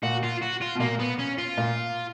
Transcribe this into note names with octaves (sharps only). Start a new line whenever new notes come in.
A#2 F#4
F4
F#4
F4
B2
A#2 A#3
B3
C#4
F4
A#2